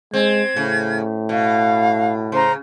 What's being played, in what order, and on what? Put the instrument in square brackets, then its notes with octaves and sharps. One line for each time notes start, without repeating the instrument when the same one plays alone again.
[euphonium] G#3 [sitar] C4 [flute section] G#6
[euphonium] A2 [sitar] C#3
[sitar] B2 [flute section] F5
[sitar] C#3 [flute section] C5 A#5 C6